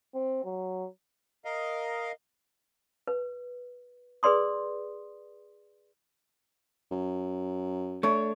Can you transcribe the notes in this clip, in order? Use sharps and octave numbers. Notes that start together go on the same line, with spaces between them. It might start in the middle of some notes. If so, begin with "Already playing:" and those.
C4
F#3
A#4 D#5 F5
B4
G#4 B4 D5 C6 D#6
F#2
A3 D4 C#5